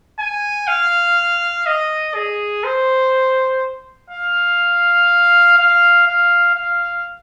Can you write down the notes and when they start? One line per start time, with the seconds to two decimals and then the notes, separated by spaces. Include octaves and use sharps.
0.20 G#5
0.68 F5
1.66 D#5
2.15 G#4
2.64 C5
4.11 F5
5.58 F5
6.07 F5
6.55 F5